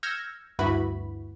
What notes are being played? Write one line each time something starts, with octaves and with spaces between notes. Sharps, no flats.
E6 F6 G6 G#6 A#6 C#7
D2 G2 E4 F#4 B4 B5